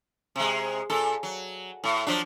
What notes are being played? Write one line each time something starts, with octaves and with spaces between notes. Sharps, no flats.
C3 G#3
A#2 A4
F#3
A2
F3 F#3 D4